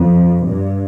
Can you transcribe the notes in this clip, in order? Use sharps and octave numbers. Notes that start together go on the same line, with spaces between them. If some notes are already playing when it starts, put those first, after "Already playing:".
Already playing: F2
G2